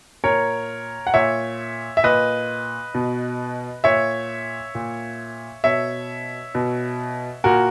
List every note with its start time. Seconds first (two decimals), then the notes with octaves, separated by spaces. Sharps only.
0.24 A#2 A#4 C#5
1.07 F#5
1.14 A#2 C#5 E5
1.97 E5
2.03 A#2 B4 D#5
2.94 B2
3.84 A#2 C#5 E5
4.75 A#2
5.64 B2 C#5 E5
6.55 B2
7.44 A#2 F#4 A#4